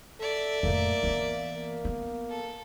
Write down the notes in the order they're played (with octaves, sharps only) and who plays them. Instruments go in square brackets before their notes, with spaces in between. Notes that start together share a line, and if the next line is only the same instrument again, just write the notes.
[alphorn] A4 [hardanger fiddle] D5 E5
[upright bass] F2 A2 [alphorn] A#3
[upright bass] E3 B3
[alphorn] A#3
[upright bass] B3
[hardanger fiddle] A4